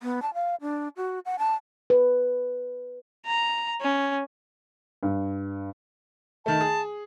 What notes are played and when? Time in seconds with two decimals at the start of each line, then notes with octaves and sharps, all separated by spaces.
0.03 B3
0.22 A5
0.34 F5
0.61 D4
0.97 F#4
1.25 F#5
1.39 A5
1.90 B4
3.26 A#5
3.81 C#4
5.03 G2
6.46 D#3 A3 A5
6.61 G#4